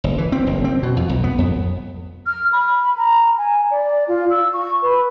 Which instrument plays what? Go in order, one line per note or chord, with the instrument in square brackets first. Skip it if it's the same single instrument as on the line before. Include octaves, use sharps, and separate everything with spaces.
[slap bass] F#1
E3
C4
F#1
C4
B2
F2
B1
B3
F2
[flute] F6
B5
A#5
G#5
D5
F4
E6
C#6
B4